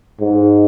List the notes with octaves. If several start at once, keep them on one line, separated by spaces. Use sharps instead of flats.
G#2